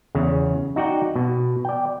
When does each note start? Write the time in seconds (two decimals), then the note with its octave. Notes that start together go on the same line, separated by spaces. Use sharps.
0.15 E2 C#3
0.76 D#4 F#4 D5 G5
1.16 B2
1.65 D5 G5